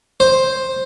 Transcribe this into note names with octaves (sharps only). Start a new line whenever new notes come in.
C5